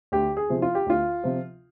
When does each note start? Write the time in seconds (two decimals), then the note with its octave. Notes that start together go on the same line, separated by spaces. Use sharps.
0.12 D2 G4
0.37 G#4
0.50 C3 F3
0.62 F4
0.75 G4
0.86 D2 F4
1.24 C3 F3